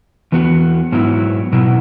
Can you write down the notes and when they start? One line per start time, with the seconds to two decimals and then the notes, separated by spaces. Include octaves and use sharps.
0.32 E2 E3 B3 F#4
0.92 G#2 F#3 B3 E4
1.53 B2 F#3 E4